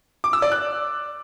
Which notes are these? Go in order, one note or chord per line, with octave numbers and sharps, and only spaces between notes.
D6
E6
D5
F#6